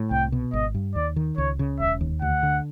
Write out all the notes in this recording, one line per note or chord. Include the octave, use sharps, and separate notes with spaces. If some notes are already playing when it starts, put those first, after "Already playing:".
Already playing: A2
C2 G5
B2
G#1 D#5
G2
D#2 D5
D#3
C#2 C#5
C#3
E1 E5
D#2
D2 F#5
D3